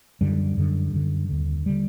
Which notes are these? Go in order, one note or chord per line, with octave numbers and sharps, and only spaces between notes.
F#2 D3 G3
F#2 D3
F#2 D3
D#2 D3
D3 G3